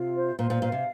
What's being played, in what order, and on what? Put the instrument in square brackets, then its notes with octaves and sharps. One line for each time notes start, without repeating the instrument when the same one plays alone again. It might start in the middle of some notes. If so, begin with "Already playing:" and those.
Already playing: [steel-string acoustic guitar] C3 [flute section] F4
[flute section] C5
[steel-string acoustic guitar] A#2 [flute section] C5
[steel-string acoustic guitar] A#2
[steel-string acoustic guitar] A#2 [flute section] F5
[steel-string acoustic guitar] C3